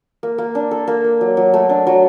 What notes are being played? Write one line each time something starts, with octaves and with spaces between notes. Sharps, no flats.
A#3
A#3
D4
A4
A#3
A#3
F#3
F#3
A3
D4
F#3